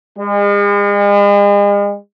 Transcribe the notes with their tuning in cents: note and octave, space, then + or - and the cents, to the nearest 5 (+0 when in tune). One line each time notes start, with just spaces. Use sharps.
G#3 -40